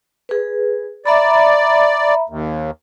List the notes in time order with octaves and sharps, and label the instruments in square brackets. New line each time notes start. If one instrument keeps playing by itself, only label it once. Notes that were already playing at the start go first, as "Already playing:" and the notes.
[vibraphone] G#4 B4
[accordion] D5 [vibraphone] E5 A#5 B5
[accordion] D#2